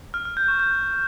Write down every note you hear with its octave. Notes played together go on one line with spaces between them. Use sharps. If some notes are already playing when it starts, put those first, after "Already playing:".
F6
F6
G6
C#6
G6